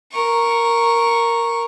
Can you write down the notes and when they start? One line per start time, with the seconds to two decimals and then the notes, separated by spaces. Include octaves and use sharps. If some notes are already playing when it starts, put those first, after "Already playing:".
0.12 A#4 C#6